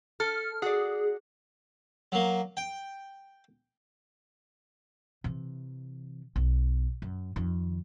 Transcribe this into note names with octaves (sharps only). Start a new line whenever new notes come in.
A4 F6
F#4 G#4 D5
F#3 A#3
G5
C3 E3
B1
F#2
F2 D#3